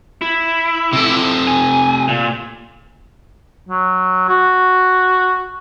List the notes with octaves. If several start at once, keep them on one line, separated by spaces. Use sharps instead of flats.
E4
C3 A4
G#5
A#2
F#3
F#4